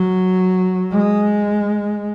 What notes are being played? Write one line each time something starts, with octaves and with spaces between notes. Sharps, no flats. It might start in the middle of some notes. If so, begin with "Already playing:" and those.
Already playing: F#3
G#3